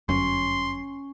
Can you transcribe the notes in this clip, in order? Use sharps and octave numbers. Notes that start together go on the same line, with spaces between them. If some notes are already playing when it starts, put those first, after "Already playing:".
G1 F#2 C#4 C6